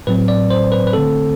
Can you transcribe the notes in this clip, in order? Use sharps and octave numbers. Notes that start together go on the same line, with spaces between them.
A2 F#3 C4 B4
D5
C5
B4
B4
D3 A3 C4 A4